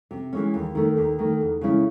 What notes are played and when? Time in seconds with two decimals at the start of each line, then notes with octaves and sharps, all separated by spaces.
0.11 C3
0.33 E3 G#3 C#4
0.54 D#2
0.75 D#3 A3
0.97 D#2
1.19 D#3 A3
1.41 E2
1.61 C#3 G#3 C#4 E4